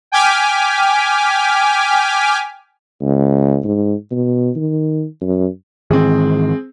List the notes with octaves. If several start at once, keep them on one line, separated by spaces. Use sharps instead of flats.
G5 G#5 D6 F6 B6
C#2
G#2
B2
D#3
F#2
G#2 D#3 E3 C4 G#4